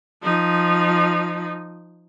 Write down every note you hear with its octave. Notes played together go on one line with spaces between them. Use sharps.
F3 D#4